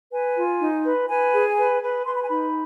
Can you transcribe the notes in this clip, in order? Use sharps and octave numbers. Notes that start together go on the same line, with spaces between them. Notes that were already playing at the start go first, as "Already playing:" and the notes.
B4 G#5
F4
D#4
B4
B4 G#5
G#4
B4
B4
B4 C6
B5
G#5
D#4 B5